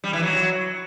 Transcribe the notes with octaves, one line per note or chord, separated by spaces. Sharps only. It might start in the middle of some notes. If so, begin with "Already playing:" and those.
G3
E3
F#3